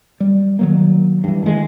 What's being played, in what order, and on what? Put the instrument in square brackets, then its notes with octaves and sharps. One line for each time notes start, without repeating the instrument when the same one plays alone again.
[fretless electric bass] G3
D#3 F#3 A#3
G2 E3
D#3 E3 G#3 A3